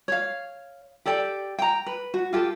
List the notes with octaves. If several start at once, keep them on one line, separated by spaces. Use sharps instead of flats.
C#5 F5
G4 A4 D5 G5
G5 A#5
B4
F#4
F4 G4 A4